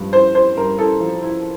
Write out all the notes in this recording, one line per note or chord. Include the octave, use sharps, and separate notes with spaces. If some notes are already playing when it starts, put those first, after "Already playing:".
Already playing: G2 F3
E4 C5
E4 C5
G2 A#4
E4 A4
F3
E4